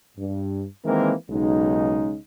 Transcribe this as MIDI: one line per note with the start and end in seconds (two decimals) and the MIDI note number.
0.18 0.64 43
0.85 1.13 51
0.85 1.13 52
0.85 1.13 56
0.85 1.13 58
0.85 1.13 60
0.85 1.13 70
1.30 2.17 35
1.30 2.17 49
1.30 2.17 56
1.30 2.17 63